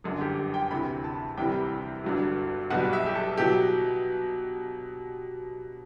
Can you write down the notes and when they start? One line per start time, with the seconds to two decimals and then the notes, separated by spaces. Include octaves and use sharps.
0.04 G1 F#2 D3
0.21 G4
0.54 G5
0.71 D2 C3 E3 B5
1.04 A5
1.38 C2 C3 E3 G3 G5
2.04 G1 G2 F#3
2.70 B1 B2 G3 F#5
2.93 E5
3.06 G4
3.15 A4
3.38 B2 F#3 G4